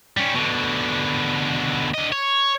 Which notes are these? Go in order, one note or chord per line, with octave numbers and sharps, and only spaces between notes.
G3 C#4
B2 D3
D3 D#5
C#5